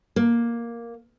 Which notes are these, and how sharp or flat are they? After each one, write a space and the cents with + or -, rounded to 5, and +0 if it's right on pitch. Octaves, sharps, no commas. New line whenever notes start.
A#3 +5